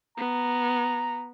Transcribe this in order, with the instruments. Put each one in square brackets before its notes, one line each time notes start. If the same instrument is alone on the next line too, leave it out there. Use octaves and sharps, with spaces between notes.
[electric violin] B3 [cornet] A#5